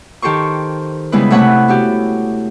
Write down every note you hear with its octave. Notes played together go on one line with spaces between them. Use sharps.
D#3 G4 A4 C5 C#6
C#3 G3 G#3 B3 E4 B4
C3 A3 C#5 F#5 B5 F#6
B3 F#4 G4